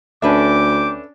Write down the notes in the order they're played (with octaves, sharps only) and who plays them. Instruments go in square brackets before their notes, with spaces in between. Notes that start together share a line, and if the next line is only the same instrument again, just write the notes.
[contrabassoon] D2 [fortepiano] C#4 D4 [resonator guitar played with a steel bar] A4 B4 E5 [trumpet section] G5 D6